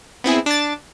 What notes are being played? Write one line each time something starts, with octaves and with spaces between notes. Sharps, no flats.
B3 C4 E4 G#4
D4 A6